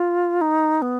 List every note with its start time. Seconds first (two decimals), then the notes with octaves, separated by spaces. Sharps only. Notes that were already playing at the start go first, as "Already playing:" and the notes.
Already playing: F4
0.41 D#4
0.82 B3